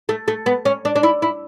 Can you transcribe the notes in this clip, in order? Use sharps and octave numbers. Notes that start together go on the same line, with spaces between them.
A3
A3
B3
C#4
D4
D4
E4
E4